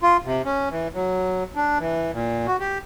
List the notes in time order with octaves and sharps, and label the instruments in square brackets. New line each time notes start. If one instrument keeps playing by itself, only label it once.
[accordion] F4
C3
C#4
E3
F#3
D4
E3
A#2
F#4
G4